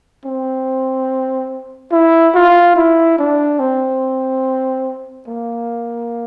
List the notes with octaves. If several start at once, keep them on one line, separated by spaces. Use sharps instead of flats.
C4
E4
F4
E4
D4
C4
A#3